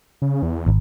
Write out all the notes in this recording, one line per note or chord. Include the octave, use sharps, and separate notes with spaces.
C#3
E2
G#1